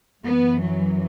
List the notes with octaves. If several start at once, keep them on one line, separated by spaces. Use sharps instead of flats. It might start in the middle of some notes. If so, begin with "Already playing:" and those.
F#2 E3 B3
F#3